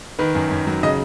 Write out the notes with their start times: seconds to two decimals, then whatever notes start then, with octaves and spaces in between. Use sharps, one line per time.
0.19 D#3 B4
0.35 F#2
0.51 F#2
0.67 F#3
0.83 C#3 D#5